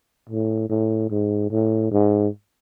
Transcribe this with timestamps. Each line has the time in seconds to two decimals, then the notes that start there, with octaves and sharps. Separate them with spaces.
0.29 A2
0.69 A2
1.10 G#2
1.50 A2
1.91 G#2